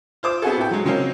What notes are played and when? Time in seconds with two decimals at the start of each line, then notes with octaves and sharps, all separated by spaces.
0.23 F4 C5 D6
0.42 B3 C4 F#4 G#4 A4
0.57 A2 G5
0.71 F#3 G#3
0.85 C#3 F#3 G#3 A#3 C4 C#4